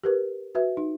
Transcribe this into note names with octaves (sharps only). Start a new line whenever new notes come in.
G4 A#4 B4
F#4 B4 E5
D#4